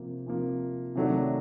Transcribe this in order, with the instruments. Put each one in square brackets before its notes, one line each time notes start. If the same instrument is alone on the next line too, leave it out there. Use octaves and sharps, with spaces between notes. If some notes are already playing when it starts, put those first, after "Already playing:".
Already playing: [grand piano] C3 F3 A#3
C3 F3 A#3
C3 D#3 F#3 A3 D4